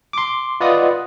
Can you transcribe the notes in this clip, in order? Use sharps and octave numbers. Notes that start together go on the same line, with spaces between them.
C6 D6
F4 B4 D5 D#5 F#5 D#6